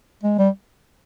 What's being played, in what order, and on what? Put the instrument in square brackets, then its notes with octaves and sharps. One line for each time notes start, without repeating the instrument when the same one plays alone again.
[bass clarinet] G#3
G3